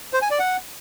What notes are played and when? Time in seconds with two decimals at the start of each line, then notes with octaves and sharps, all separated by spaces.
0.13 C5
0.22 G#5
0.31 D5
0.39 F#5